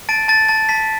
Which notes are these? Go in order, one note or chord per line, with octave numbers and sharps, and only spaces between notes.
A5 A6 D7
A5 A6
A5 A6
A5 B6